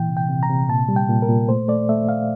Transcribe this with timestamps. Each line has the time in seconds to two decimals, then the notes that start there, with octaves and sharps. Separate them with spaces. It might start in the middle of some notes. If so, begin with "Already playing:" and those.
Already playing: A#2 E3 G5
0.09 C3
0.17 G5
0.29 C3
0.43 A#5
0.49 C3
0.69 A#2 A5
0.89 G3
0.96 G5
1.09 A#2
1.22 A#4
1.29 A#2
1.49 A3 C5
1.68 A3 D5
1.89 A3 E5
2.09 A3 F5